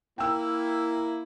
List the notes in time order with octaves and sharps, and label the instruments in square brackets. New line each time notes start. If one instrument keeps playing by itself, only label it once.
[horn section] A#3 E4 [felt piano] G5 E6